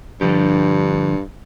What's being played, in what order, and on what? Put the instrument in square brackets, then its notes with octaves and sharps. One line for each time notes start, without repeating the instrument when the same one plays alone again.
[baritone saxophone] G2 [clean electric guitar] D3 F3 G4